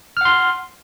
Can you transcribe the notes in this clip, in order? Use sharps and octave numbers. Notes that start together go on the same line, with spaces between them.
F#5 C6 F6